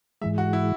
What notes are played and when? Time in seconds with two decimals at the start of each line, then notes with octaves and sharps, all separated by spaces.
0.22 G#2 E3 G#3 E5
0.38 F#4
0.53 E4